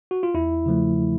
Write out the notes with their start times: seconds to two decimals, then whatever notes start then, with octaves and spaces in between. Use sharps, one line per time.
0.11 F#4
0.23 F4
0.34 E2 E4
0.66 C#3 F3 A3